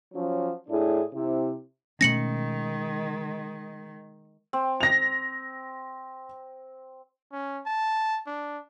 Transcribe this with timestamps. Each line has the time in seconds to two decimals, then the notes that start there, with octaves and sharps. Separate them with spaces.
0.14 F3 F#3 C#4
0.69 A2 D4 E4 G#4
1.13 C3 E4
2.01 B2 D#3 G#3 A3 C#4 A#6 C#7 F#7
4.53 C4
4.81 A#6 F7
7.32 C#4
7.66 A5
8.27 D4